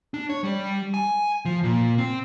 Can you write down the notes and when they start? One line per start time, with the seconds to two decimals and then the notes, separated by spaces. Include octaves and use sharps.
0.14 D4
0.30 C#5
0.44 G3
0.94 G#5
1.45 F3
1.64 A#2
1.98 C4